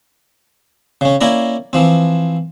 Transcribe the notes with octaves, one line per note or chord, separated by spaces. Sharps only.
C#3 C#4
A#3 C#4 E4 D5 A#5
E3 F3 C4